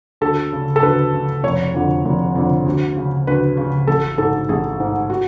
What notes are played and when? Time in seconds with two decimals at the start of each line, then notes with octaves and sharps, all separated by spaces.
0.21 D2 A4
0.52 C#3
0.76 A4
0.82 D2 B4
1.14 C#3
1.43 F1 C#5
1.74 F2 D3
2.05 F1
2.35 F2 D3
2.66 D2
2.96 C#3
3.27 D2 B4
3.57 C#3
3.87 A1 A4
4.18 G#2 A4
4.49 A1 G#4
4.80 G#2
5.10 F#4